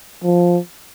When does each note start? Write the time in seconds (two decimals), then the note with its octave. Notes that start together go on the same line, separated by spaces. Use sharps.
0.24 F3